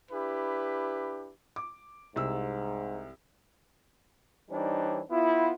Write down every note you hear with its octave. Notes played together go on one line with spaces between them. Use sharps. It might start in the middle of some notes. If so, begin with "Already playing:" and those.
D4 E4 G4 B4
D6
C2 G#2 E6
E3 G3 D4 D#4 C5 C#5
B3 E4 F4